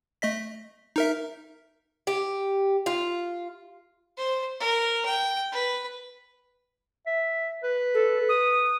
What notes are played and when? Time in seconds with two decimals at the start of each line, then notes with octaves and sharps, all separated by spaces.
0.22 A3 D#5 B6
0.96 D#4 A#4 E5
2.07 G4
2.86 F4
4.18 C5
4.60 A#4
5.06 G5
5.52 B4
7.07 E5
7.64 B4
7.94 A4
8.29 D#6